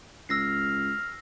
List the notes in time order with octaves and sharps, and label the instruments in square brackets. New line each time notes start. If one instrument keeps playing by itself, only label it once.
[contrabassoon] C#2 [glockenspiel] E6 A#6 C7 [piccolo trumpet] F6